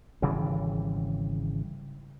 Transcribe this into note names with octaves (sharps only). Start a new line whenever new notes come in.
G#1 C#3 E3 G3